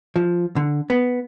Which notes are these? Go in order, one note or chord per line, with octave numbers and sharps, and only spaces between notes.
F3
D3
B3